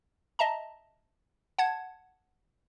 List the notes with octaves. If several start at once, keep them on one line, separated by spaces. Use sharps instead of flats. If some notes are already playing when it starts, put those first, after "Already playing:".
D#5 E5 A5 A#5
F#5 A5 G#6